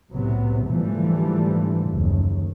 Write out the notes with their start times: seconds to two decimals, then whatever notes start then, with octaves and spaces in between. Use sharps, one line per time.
0.12 C2 A2 C3 F#3 B3
0.69 G#2 D3 E3 F3 G3 A3
1.90 F#1 D#2